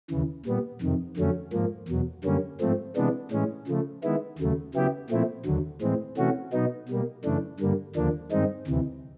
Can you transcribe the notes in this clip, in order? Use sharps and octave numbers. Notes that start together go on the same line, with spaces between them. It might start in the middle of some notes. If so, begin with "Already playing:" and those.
D#2 C#3 E3
A#2 G3 B3
F2 C3 D#3
F2 D3 F#3 A3 C#4
G#2 F3 A#3
E2 B2 F#3
F#2 D3 G3 A#3 C#4
G#2 F3 A3 C4
C3 E3 G#3 B3 D4
A2 E3 G#3 C#4
C#3 F3 A3
D#3 G#3 B3 E4
D#2 C#3 F#3 A3
C#3 F#3 B3 E4 G4
A#2 F3 A3 C4 E4
D#2 D3 F#3
A2 E3 G#3 C4
C3 E3 A3 C#4 F#4
B2 F#3 B3 D#4
B2 G3 A#3
F#2 C#3 E3 A3 D4
G2 D3 G3 A#3
D#2 D3 F3 A#3 D4
G2 D#3 G#3 C4 D#4
D2 C3 E3